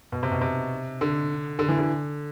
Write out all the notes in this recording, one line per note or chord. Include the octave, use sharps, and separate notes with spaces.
B2
C3
B2
C3
D3
D3
E3
D3